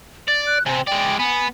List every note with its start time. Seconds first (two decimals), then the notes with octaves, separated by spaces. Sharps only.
0.28 D5 A6
0.47 F#6
0.66 C3 C4 G#5
0.87 G#3 D5 G5
1.19 B3 G#5